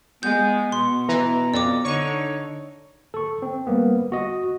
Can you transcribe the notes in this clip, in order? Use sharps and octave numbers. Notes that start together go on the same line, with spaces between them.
G#3 B3 G6
B2 C6
E3 A#5
F2 D5 D6
D3 D#4 C#5 C#6
A4 C#6
C4
G3 A#3 B3
F#4 D#5